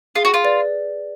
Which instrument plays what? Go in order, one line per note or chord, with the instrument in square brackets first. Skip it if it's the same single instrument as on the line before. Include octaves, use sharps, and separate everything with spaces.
[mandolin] F4 [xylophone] G#4
[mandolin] F#4
F4
[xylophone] B4 D5